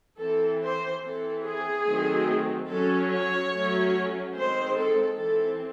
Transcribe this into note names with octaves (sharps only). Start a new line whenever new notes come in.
E3 C4 A4
C5
E3 C4 A4
G#4
D#3 F#3 A3 C4
F#3 C#4 A4
C#5
F#3 A3 C#4
D#3 G#3 C4 C5
A4
E3 C4 A4